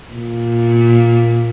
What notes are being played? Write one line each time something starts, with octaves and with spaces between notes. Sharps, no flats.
A#2